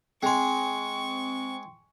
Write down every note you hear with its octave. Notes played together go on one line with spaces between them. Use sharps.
G#3 C4 G5 G#5 C6 C#6